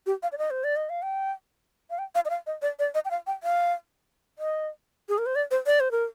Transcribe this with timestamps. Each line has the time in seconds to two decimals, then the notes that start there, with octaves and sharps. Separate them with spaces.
0.06 G4
0.23 F5
0.32 D5
0.38 D#5
0.51 C5
0.64 D5
0.76 D#5
0.89 F5
1.02 G5
1.90 F5
1.99 G5
2.15 F5
2.25 D#5
2.30 F5
2.47 D#5
2.62 D5
2.79 D5
2.95 D#5
3.05 G5
3.11 F5
3.27 G5
3.43 F5
4.39 D#5
5.09 G#4
5.18 A#4
5.26 C5
5.36 D5
5.51 C5
5.66 D5
5.80 C5
5.91 A#4